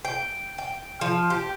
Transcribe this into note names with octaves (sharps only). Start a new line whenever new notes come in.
G5
G5
F3
G4